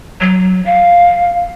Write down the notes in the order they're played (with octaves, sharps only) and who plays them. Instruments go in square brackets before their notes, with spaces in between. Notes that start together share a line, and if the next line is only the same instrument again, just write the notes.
[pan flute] F#3
F5